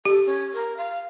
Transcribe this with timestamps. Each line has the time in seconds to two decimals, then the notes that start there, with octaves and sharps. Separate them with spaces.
0.05 G4 A4
0.26 C#4
0.54 A#4
0.77 F5